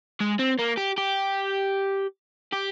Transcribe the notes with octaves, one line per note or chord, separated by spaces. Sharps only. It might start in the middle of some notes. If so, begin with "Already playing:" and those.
G#3
C4
A#3
G4
G4
G4